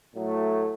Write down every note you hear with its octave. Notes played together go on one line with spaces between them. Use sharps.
A2 F#3 A3